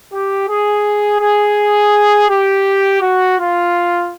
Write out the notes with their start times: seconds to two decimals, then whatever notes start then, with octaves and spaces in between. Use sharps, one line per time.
0.12 G4
0.49 G#4
1.20 G#4
2.29 G4
3.01 F#4
3.37 F4